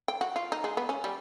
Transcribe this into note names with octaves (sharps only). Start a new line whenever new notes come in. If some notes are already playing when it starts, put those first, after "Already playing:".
G5
F#4
F4
D#4
G#3
B3
C#4
G3